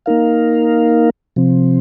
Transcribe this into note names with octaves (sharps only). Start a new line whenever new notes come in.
A#3 D#4 A#4 F5
C3 F3 C4